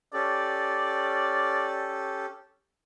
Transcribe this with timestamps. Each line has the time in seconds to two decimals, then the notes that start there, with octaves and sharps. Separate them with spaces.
0.14 C#4 G4 A4 D5